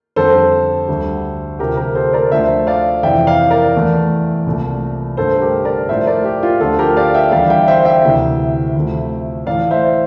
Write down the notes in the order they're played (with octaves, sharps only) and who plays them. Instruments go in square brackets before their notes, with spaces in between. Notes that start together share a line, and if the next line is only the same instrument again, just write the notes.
[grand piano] F2 D3 G3 A4 C5
D2 D3 G3
D2 C3 F3 G4 A#4
G4 A#4
A4 C5
A#4 D5
D2 D3 F3 A3 C5 E5
D5 F5
F2 C3 E3 E5 G5
D5 F5
A#4 D5
E2 E3 A3
C2 A#2 A3
G2 D3 A3 A4 C5
G4 A#4
A#4 D5
A2 F3 A3 C5 E5
A#4 D5
G4
F4
D2 D3 F3 A3 F4 A4
G4 A#4
D5 F5
E5 G5
E2 D3 G3 D5 F5
E5 G5
C5 E5
E5 G5
D2 C3 E3
D2 C3 F3 A3
A2 E3 A3 D5 F5
C5 E5